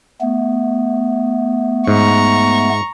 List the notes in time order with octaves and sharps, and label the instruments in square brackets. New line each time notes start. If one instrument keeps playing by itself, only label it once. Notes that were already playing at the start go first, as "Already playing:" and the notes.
[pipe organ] A3 B3
[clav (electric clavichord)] G#2 [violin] A#5 C#6